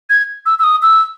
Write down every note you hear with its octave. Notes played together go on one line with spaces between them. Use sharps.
G#6
E6
E6
D#6
E6